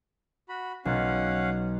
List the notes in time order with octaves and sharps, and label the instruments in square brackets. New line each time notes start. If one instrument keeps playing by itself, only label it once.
[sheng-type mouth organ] F#4 B5
[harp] B1 [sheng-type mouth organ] C#4 F5 F#5